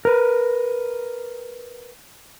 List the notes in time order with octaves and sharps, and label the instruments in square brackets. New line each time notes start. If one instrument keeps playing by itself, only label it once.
[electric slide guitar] A#4 B4